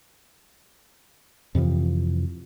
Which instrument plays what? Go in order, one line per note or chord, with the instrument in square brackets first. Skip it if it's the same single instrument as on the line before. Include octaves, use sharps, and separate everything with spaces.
[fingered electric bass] F2 C3 E3 F3